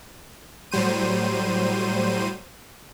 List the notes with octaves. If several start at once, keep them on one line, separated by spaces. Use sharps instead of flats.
A2 F#3 G3 C5 D#7